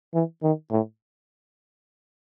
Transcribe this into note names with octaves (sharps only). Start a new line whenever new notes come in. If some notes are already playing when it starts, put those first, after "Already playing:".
E3
D#3
A2